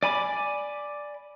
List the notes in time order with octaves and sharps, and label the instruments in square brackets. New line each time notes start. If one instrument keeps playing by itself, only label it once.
[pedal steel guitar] D5 G#5 B5 D6